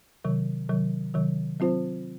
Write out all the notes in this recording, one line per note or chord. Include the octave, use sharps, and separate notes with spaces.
C3 D#3 F#3
C3 D#3 F#3
C3 D#3 F#3
F#3 C4 F4 C5